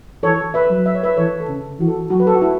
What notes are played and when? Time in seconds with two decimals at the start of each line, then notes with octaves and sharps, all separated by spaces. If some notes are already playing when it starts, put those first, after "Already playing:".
0.23 E3 A4 C#5
0.54 B4 E5
0.70 F#3
0.86 E5
0.95 C#5
1.03 B4 E5
1.17 E3 A4 C#5
1.40 A4
1.48 C#3
1.79 E3 F#4
1.88 A4
2.10 F#3 F#4
2.20 B4
2.27 A4
2.34 F#4
2.42 E4